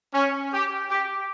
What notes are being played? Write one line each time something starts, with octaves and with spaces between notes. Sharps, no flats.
C#4
G4
G4